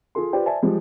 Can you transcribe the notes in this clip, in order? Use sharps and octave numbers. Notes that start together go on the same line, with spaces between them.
F4 G#4 A4 C6
F4 G4 B4 C5 D5 G5
C5 D5 E5 G#5 A5
F3 G3 G#3